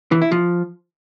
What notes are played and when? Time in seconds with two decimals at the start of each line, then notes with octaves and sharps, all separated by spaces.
0.12 E3
0.22 E4
0.32 F3